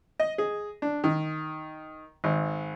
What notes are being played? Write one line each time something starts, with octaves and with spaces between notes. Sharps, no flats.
D#5
G#4
D4
D#3
G#1